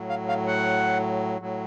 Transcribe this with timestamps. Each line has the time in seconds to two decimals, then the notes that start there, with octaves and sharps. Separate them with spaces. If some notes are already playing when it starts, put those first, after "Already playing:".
Already playing: A2 F#3
0.09 F5
0.28 F5
0.47 F#5
1.40 A2 F#3